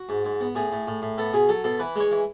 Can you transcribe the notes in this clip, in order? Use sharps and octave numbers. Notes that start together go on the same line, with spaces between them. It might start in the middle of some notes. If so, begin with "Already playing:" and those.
Already playing: F#4
G#2
G#2
B3
A2 G#4
A2
A2
A2
B3 A4
B2 G#4
F#3 A4
B2 A4
E3 B4
G#3 C#5
E3